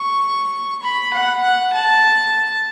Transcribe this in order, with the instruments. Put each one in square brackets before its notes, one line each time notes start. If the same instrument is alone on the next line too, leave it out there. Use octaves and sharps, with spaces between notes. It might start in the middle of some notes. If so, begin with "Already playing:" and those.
Already playing: [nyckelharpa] C#6
B5
F#5
F#5
A5